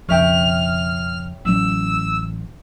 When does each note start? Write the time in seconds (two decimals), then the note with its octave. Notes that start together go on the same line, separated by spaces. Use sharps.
0.09 B1 F2 C#3 C#5 E5 G5 F6
1.45 A1 F#3 C#4 E6